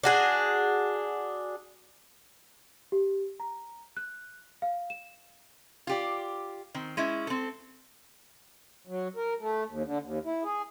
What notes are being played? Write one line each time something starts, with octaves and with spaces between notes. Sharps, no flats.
D4 F#4 G#4
G4
A#5
F#6
F5
E7
F4 G4 D5
D#3 C4
G#3 C#4 E4
C4 A4
F#3
A#4
A3
D#2
D3
D#2
E4
G#4